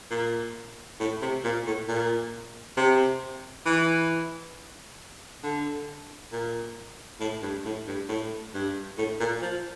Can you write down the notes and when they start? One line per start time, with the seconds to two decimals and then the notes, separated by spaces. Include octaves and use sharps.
0.11 A#2
1.00 A2
1.22 C3
1.44 A#2
1.66 A2
1.88 A#2
2.77 C3
3.66 E3
5.43 D3
6.32 A#2
7.20 A2
7.42 G2
7.65 A2
7.87 G2
8.09 A2
8.54 G2
8.98 A2
9.20 A#2
9.42 F3